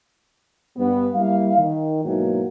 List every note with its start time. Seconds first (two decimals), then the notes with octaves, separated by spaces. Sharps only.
0.77 G2 B3
1.15 G3 A#3 E4 F5
1.58 D#3
2.05 G#2 B2 E3 F#3 A#3